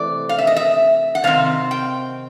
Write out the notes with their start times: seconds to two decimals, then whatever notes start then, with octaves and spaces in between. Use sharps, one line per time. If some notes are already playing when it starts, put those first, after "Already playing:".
Already playing: C3 E3 A3 C4 D5
0.29 F5
0.38 E5
0.47 D#5
0.56 E5
1.15 F#5
1.24 C3 D#3 C4 F5
1.71 G5